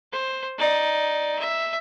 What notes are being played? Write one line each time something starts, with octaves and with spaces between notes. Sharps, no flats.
C5
D#4 D5
E5